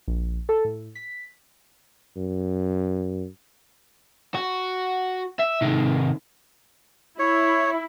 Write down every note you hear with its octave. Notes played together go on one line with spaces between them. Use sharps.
A#1
A4
A2
B6
F#2
F#4
E5
C3 D#3
E4 C#5